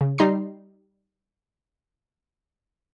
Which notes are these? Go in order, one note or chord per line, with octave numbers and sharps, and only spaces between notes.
C#3
G3 D#4 A#5 C6 C7